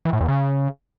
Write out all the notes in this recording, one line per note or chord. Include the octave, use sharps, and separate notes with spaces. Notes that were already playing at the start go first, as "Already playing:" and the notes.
E3
A2
E2
C#3